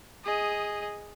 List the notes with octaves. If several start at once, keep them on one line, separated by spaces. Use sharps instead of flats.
G#4 D#5